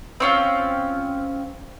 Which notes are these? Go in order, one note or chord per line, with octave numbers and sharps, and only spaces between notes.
C4 C#4 F4